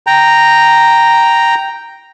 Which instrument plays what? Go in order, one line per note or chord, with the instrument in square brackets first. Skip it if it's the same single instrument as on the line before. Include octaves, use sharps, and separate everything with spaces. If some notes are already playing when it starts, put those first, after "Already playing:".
[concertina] G5 A#5